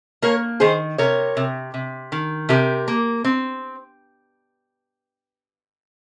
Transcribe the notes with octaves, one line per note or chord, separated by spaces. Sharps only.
A#3 A#4 C#5
D#3 G#4 C5
C3 A#4 C#5
C3
C3
D#3
C3 G4 A#4
A#3
C4